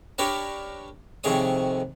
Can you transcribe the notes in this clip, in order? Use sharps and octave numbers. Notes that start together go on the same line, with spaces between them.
D4 G4 A#4 B4 C#5
F2 C3 D#3 G#4 C#5 D#6